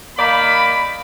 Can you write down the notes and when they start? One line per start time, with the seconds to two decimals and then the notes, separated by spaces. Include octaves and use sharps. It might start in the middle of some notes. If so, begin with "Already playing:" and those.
0.18 D#3 A#3 D5 B5